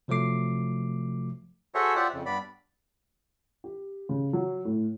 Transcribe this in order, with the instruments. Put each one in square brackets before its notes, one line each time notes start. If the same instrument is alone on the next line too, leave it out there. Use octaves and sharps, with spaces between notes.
[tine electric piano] C3 F3 F#3 A3 D6 C7
[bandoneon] F#4 G#4 A4 C5 C#5 E5
F4 G4 C5 D5 E5 F#5
F2 C#3
G2 B3 D5 B5
[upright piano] G4
C#3
F#3
A2